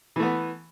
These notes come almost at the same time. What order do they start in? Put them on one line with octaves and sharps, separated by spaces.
E3 A3 B3